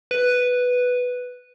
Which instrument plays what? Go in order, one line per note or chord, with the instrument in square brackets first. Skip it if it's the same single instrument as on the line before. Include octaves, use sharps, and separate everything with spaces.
[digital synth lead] B4